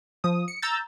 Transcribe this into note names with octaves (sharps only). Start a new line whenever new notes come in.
F3 D#6
C#7
A#5 E6 G6 A6